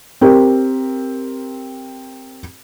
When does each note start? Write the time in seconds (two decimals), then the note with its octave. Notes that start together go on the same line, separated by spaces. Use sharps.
0.21 C4 G4 A#4